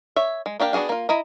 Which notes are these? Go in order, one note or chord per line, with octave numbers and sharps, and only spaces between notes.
C#5 E5
G#3
A#3 D4 G4 F5
B3 D4 F#4 G#4 F5
A#3 F4
E4 D#5 A#5